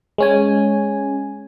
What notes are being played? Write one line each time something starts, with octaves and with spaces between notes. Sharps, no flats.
G#3 C#4 G#5